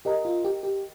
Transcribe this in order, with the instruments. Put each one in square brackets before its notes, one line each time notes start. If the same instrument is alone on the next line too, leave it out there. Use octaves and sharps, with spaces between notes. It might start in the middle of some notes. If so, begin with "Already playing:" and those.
[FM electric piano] G4 [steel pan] A#4 D#5 A#5
[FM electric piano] F4
G4
G4